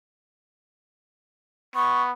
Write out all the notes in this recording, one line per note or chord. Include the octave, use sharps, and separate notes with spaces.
B3 C#6